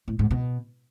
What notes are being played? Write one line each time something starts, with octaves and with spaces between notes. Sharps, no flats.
A2
G#2
B2